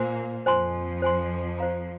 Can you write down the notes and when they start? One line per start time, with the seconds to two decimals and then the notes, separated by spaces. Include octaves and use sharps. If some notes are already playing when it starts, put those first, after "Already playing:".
Already playing: A#2 A#3 C5 G#5 C6
0.46 F2 F3 C5 G#5 C6
1.02 C5 G#5 C6
1.59 C5 F5 A#5